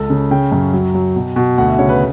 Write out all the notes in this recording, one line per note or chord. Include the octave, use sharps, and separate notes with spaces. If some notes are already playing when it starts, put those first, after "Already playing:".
Already playing: C#2 A4
C#3
C#3 G5
F#2
F#3
F#3
B2
B2
D2 F#5
E5
C#3 C#5
B4